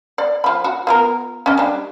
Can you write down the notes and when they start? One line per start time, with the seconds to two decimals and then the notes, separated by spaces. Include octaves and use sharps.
0.18 D5
0.44 F3 B5
0.64 F#4
0.87 B3 F4 A#4
1.46 C#4 D#5
1.58 G3 D4